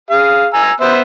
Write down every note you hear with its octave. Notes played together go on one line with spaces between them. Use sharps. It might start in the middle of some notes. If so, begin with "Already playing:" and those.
G#4 F5
G#5 A#5 E6
B3 C5 E5